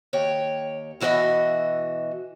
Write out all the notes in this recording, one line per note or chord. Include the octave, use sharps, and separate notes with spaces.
D#2 C#5 G5
B2 E3 F#4 A#4 D#5 E5